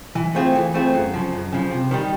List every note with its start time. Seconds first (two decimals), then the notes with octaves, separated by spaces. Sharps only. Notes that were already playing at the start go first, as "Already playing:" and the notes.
0.15 E3
0.35 A3 C4 F4 G#4
0.55 E3
0.74 A3 C4 F4 G#4
0.94 F#2
1.14 C#3 F3
1.33 F#2
1.52 C#3 F3
1.71 C3
1.91 D#3 G3